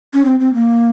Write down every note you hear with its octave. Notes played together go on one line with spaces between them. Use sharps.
C#4
C4
C4
A#3